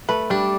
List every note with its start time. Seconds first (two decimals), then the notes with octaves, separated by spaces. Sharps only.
0.09 A3 B4
0.30 G3 D4